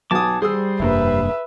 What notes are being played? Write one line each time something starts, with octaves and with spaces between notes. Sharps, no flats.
B1 F#4 G#5 A5 D6 D#6
G3 G#4 C5 D#6 E6
F1 G2 A#3 B4 E5